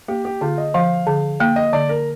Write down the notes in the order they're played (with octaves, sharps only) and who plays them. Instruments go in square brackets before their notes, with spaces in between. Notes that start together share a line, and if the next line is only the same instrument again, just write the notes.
[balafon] A#3 [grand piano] G4
[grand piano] G4
[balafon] D3 [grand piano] F4
[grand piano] D#5
[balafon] F3 [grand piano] F5
[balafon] D3
[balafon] A#3 [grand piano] G5
[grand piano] D#5
[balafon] D3 [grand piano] D5
[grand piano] A#4